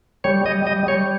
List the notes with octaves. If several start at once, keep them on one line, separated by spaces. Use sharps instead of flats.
G3 C#5
G3 D#5
G3 D#5
G3 C#5